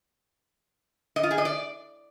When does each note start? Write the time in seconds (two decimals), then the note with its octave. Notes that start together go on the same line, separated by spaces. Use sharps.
1.16 D#5
1.23 F4
1.31 G#4
1.38 D#5
1.45 D5